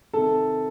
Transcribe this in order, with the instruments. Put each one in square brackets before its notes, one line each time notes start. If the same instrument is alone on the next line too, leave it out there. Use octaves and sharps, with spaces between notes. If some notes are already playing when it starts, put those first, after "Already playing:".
[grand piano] C3 D#3 A4